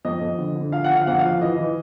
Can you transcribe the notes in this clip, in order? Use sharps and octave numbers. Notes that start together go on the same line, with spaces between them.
F2 D#5
F2
D3
D3
F3 F5
F#5
D3
F5
F2 F#5
F5
F3
E3 D#5
E3